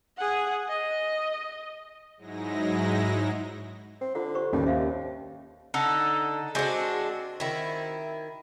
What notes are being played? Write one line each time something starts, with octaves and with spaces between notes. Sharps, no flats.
G#4 F#5
D#5
G#2 F#3 G#3 D#4 E4 A#6
C4
D3 F4 F#5
G4 C5 C#6
D#2 G3 C#4
C4 E5 F5
D3 D#4 A4 F#5
G#3 C4 D4 F#4
D#3 E4